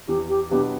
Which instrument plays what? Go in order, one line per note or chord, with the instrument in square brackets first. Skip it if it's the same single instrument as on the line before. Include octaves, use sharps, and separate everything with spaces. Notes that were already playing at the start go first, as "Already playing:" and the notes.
[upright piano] E2 [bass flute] G4
[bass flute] G4
[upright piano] B2 F#3 B3 D4 [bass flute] G4